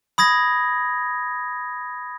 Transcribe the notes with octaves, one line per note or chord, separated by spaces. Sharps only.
B5 D#6 G#6 A#6